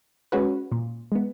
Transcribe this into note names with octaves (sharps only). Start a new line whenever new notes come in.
G#3 C#4 F#4 B4
A#2
G#3 B3